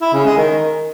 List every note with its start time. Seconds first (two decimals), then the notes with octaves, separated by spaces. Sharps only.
0.02 E4
0.13 C#3
0.25 G#3
0.37 D#3